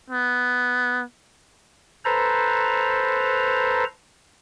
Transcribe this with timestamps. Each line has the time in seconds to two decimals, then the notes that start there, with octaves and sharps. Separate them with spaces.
0.10 B3
2.05 A4 B4 C5 A#5